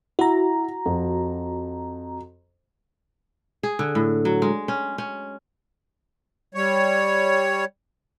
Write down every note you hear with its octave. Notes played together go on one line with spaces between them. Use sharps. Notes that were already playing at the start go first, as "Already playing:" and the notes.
E4 F#4 A#5
F2
G#4
D3
A2
F#3
G#3
C#4
C#4
G3 C#5